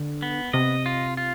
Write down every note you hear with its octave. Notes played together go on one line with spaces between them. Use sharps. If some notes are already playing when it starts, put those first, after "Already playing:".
Already playing: D3
B3
C3 D#5
F4
F4